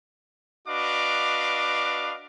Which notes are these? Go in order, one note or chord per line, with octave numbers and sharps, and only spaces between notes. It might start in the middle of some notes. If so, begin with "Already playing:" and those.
D4 F#4 B4 D#5 F5 D6